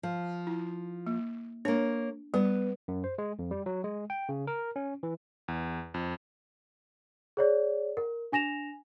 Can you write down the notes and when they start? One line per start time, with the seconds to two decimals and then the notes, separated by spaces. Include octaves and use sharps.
0.03 F3
0.47 E4
1.07 A#3
1.65 A#3 D4 C#5
2.34 G3 B3
2.88 F#2
3.04 C5
3.18 G#3
3.39 F2
3.51 G3
3.66 F#3
3.84 G#3
4.10 G5
4.29 C#3
4.47 A#4
4.76 C#4
5.03 E3
5.48 E2
5.94 F2
7.37 G#4 C#5 D5
7.97 A#4
8.32 D4 G#5 A#6 E7 F7